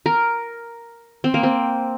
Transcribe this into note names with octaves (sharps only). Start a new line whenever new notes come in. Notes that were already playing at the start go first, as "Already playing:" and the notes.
A#4
C4
A#3
C4